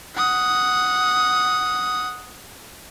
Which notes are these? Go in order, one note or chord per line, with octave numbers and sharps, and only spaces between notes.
F#5 D#6